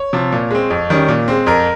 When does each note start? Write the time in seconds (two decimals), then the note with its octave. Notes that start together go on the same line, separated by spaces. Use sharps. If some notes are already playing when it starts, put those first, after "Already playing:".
Already playing: C#5
0.13 C3 F3
0.32 A#2
0.51 G#3 C4
0.70 F2
0.90 D#3 G3 C#4
1.08 A#2
1.28 G#3 C4
1.47 F2 A#4